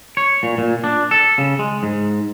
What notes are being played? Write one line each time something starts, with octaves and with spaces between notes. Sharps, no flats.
C#5
A#2
A#2
D4
A4
C#3
G#3
G#2